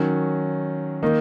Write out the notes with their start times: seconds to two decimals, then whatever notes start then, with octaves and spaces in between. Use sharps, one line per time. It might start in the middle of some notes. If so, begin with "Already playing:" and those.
Already playing: D#3 F#3 C#4
1.03 D#3 A#3 D#4